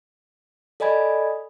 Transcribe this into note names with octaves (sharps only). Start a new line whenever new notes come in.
A4 D5 D#5 G#5 B5 G#6